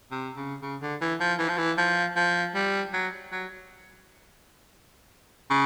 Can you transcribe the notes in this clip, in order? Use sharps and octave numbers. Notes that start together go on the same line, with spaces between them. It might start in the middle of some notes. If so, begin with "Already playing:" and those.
C3
C#3
C#3
D3
E3
F3
E3
F3
E3
F3
F3
G3
F#3
F#3
C#3